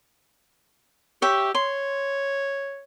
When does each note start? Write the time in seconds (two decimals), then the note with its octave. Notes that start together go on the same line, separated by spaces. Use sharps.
1.22 G4 C#5 E5 G5
1.55 C#5 C6